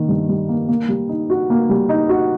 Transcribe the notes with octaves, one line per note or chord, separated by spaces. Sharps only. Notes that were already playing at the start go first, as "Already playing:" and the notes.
Already playing: D#3 A#3
G2
G3
A#3
A#3
G3
D#4
F#4
A#3
G3
D#4
F#4